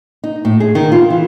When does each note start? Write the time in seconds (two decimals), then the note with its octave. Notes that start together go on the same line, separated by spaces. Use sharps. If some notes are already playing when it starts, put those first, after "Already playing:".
0.24 D#4
0.45 A2
0.60 G#4
0.75 D#3
0.92 F4
1.10 E3